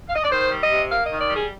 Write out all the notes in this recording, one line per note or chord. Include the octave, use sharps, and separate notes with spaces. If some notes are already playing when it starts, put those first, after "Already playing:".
F5
D#5
D5
D#3 C5
G3
D#5
C3
A#3 F5
D#5
D#3
D5
G3
G#4